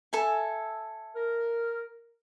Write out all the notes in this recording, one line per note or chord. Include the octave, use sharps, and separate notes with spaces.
A4 E5 G#5
A#4